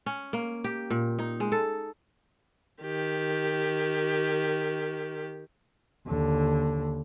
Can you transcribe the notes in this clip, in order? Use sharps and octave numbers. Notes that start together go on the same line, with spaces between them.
C#4
A#3
G4
A#2
D#4
G#3
A4
D#3 G4
D#2 D3